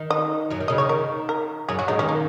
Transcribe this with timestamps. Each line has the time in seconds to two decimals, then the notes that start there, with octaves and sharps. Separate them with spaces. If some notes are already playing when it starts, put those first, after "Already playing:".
Already playing: D#3
0.10 D#5
0.50 F#2 F#3
0.60 D#3
0.68 C#3 D#5
0.78 D#3 C#5
0.89 A#4
1.29 A#4
1.69 F#2 F#3 G#4
1.79 F#2 F#3 F#4
1.88 G#2 G#3 D#4
1.99 D#3 C#4
2.09 A#3